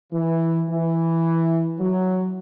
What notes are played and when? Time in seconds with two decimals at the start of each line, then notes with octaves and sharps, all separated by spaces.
0.13 E3
0.68 E3
1.79 F#3